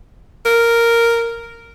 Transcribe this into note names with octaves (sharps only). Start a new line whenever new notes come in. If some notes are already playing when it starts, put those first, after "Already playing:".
A#4